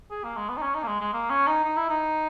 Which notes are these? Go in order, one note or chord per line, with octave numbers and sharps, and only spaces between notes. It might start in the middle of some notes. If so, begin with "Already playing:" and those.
G#4
A#3
G#3
B3
D#4
C#4
D#4
A#3
G#3
G#3
A#3
C#4
D#4
D#4
E4
D#4